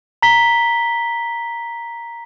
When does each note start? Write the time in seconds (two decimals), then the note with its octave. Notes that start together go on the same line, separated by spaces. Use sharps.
0.22 A#5 B6 G7